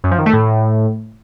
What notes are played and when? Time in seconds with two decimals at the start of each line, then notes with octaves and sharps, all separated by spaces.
0.04 F#2
0.11 F3
0.18 D#3
0.26 A3
0.33 A2